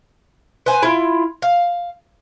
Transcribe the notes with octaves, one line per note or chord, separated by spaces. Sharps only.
B4 C5 G#5
E4 F4
F5